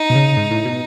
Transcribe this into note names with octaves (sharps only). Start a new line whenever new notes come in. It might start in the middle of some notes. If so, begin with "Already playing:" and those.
Already playing: D#4
B2
C#3
G#2
A2
B2